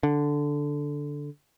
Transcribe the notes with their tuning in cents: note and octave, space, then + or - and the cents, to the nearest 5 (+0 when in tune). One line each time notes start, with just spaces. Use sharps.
D3 -5